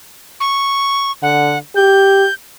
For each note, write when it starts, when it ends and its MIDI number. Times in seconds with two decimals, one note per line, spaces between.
0.40 1.12 85
1.23 1.58 50
1.23 1.58 78
1.76 2.26 67
1.76 2.34 91